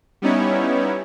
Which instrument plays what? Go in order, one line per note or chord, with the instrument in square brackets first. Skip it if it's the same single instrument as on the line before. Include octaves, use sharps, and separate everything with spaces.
[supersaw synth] G3 B3 C#4 D#4 E4 C#5